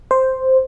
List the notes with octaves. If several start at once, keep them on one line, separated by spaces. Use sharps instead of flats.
C5